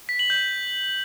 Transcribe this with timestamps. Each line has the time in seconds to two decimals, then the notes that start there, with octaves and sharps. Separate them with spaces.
0.09 B6
0.19 F#7
0.30 G6